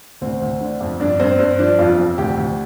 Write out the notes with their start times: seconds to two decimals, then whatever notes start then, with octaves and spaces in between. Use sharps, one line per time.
0.21 D2 C4
0.42 D2
0.61 D3
0.81 F2
1.00 G2 D4
1.19 G2 C4
1.39 G2 C4
1.59 F3 D4
1.79 F2 F4
1.98 F2
2.18 D2 G4
2.37 D2